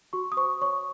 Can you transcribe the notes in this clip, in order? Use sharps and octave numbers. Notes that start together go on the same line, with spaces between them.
F#4 C#6
D#6
C5 C#6
C#5 C#6